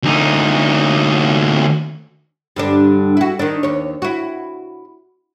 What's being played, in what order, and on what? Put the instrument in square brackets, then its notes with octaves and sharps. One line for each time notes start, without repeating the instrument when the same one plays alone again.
[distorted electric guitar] D2 D#4
[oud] G2 D3 D4
E4 F#4
D#3 D4
D#2 C#5
E4 F#4